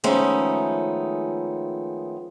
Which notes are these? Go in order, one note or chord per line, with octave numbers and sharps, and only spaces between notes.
D#3 F3 G#3 A3 B3 C#4